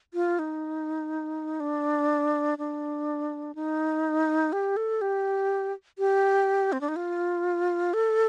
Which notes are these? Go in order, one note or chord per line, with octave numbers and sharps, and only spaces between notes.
F4
D#4
D4
D4
D#4
G4
A4
G4
G4
C4
D4
D#4
F4
A4